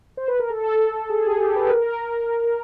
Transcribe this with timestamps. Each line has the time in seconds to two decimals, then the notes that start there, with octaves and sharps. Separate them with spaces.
0.17 C5
0.28 B4
0.40 A#4
0.50 A4
1.09 G#4
1.26 G4
1.41 G4
1.56 B4
1.69 A#4